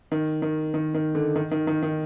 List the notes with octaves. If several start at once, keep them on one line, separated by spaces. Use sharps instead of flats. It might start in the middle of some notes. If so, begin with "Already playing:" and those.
D#3
D#3
D#3
D#3
D3
D#3
D#3
D#3
D#3